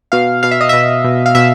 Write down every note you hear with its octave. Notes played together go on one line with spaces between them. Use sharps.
B2 F5
B2 F5
E5
D#5
B2 E5
B2
F5
B2 E5